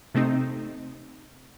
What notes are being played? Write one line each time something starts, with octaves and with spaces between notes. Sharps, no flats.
C3 A3 C4 D#4